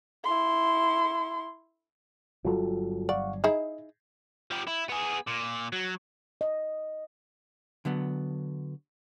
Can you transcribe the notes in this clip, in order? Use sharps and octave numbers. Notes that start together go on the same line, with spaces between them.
E4 C6
G1 F#3 G3 F4 F#4 A4
D5 F5 F#5 C#6
D#4 E4 G#4 D#5
F3 G4
E4
B3 G#4
A#2
F#3
D#5
D3 F#3 B3